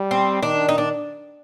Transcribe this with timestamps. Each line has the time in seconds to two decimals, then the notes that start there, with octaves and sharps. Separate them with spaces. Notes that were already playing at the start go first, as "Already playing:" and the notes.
Already playing: G3
0.11 C4
0.42 D#3 D4
0.69 D#4
0.78 D4